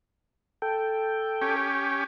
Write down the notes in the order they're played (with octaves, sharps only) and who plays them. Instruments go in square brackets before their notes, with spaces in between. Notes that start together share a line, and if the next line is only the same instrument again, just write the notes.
[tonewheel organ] A4 G5
[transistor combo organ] C#4 G4